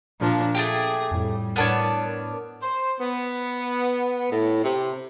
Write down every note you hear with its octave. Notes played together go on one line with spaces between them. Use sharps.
A#2 F3 D4
A3 C4 G4 G#4
F2 A2 G3
A2 B3 D4 A#4 C#5 F6
C5
B3
A2
C3